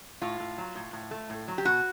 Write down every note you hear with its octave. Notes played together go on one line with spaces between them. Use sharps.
A2 F4
A2
F#3
A2
A2
A3
A2
F#3
G4
B2 F#4